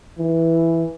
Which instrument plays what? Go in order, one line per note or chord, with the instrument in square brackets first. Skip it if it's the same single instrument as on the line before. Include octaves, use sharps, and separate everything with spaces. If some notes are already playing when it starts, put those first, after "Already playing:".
[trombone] E3